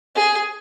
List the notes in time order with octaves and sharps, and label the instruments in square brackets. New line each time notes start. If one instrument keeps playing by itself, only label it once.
[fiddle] G#4